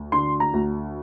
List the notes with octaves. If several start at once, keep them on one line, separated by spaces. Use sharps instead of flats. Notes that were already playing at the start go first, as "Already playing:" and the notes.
Already playing: D2
D3 C6
A#5
D2